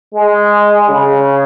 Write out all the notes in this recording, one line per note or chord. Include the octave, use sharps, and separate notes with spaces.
G#3
C#3